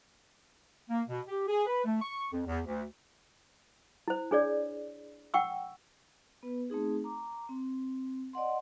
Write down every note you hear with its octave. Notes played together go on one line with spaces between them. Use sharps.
A#3
B2
G4
G#4
B4
A3
C#6
F2
E2
D2
E4 C5
D4 G#4 C#5 D5
F#5 G5 C#6 E6
B3 B4
A3 C4 D#4 G#4
A#5 D6
C4
D5 D#5 F#5 C6